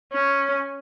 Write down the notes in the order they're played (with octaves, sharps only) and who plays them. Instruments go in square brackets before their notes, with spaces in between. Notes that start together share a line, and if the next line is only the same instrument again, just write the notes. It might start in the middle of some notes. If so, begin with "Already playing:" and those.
[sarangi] C#4